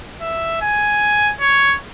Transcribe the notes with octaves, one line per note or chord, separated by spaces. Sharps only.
E5
G#5
C#5